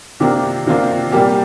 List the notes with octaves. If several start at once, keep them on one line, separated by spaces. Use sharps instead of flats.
C3 D#3 A#3 D4 F4 G4
C3 D#3 A#3 D4 F4
A#2 G3 A#3 G4